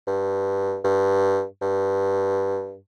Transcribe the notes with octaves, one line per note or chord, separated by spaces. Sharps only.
G2
G2
G2